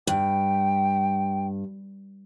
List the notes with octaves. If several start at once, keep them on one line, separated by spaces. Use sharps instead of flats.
G2 G5